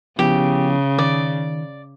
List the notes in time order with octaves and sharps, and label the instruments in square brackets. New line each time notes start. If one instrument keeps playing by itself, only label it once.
[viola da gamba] C#3 [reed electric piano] F3 B3 E4 [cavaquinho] G4
[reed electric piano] D#3 [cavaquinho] D5